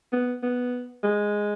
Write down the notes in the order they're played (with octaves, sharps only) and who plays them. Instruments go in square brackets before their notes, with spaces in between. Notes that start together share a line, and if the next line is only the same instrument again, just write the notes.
[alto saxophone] B3
B3
G#3